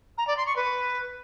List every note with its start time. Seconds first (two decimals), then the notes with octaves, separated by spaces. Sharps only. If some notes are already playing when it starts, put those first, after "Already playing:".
0.18 A#5
0.27 D5
0.37 C6
0.46 C#6
0.56 B4